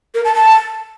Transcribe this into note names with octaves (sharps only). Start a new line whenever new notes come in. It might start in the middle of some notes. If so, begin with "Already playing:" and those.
A#4
A5
A5